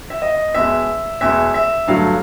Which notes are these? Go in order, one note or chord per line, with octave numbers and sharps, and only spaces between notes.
E5
D#5
E2 B2 G#3 E5
E2 B2 G#3 E5
E5
G2 D3 F#3 A3 F5